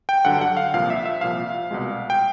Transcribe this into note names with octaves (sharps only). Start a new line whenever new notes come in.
G5
G2 D3 F#3 F#5
F#5
F5
C2 A#2 F3 F5
E5
E5
C2 A#2 F3 F5
C2 B2 G#3
G5